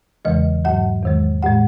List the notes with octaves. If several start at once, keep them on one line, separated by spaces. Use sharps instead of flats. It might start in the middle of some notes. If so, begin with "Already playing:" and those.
E2 C#3 E3 G#3 D#5
G#2 F#3 F#5
E2 D#3 G#3
A2 G#3 F#5